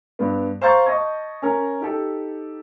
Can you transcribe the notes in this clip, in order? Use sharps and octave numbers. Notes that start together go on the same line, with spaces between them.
G2 B3
C5 F5 A#5 C#6 G6 A6
D#5 A5 C#6 G#6
C#4 A#4
D#4 G4 A4